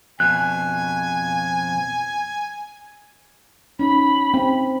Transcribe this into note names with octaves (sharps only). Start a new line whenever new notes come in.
F2 B2 G#5 F#6
C#4 D#4 B5
C4